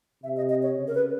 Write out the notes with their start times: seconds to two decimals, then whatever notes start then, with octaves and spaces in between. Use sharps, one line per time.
0.23 C3 E5
0.37 D#5
0.49 D#5
0.62 C#5
0.77 C#3
0.87 A#4
0.95 B4